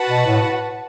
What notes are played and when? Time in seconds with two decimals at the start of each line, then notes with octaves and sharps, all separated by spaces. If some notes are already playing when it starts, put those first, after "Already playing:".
Already playing: F#4 B4 F#5 A5
0.09 B2
0.26 A2